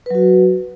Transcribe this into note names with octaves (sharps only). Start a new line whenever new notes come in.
F#3 F#4 B4